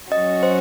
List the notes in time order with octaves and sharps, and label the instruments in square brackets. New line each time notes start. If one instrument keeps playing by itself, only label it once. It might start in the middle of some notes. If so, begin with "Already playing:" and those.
[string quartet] F#3 C#4 F#4 [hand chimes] D#5
[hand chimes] C5